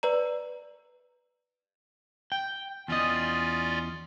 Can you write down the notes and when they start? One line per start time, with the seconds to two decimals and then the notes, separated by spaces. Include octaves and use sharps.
0.03 B4 D5 A#5
2.32 G5
2.88 E2 C#4 F4 D5 D#5